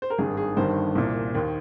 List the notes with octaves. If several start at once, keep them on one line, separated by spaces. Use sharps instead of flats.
C5
A#4
G#1 G2 D#3 G#4
G#4
G1 G2 D#3 C5
C2 A#2
D#2 D#3